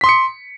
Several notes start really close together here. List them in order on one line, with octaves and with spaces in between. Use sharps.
B6 C6 D#6 C#7